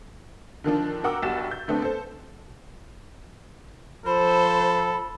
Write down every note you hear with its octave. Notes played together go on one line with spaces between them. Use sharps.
D3 D#3 F3 D4
F#4 A#4 F#5 G5 D6 E6
B1 G2 F#4 G4 A6 E7
G6
D3 A3 B3 C4 D4
A4 C5
F3 A4 C5 B5